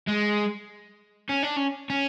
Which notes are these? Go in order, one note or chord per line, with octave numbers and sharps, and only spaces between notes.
G#3
C#4
D4
C#4
C#4